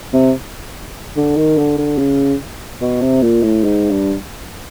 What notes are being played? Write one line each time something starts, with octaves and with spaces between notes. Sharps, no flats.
C3
D3
D#3
D3
D3
C#3
B2
C3
A#2
A2
G#2
G2